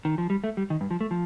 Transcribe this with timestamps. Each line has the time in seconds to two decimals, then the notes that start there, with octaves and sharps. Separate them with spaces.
0.05 D#3
0.18 F3
0.30 G3
0.44 A3
0.57 G3
0.70 D#3
0.81 G2
0.91 F3
1.01 A3
1.11 F3